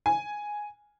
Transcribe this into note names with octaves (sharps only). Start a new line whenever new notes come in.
G#5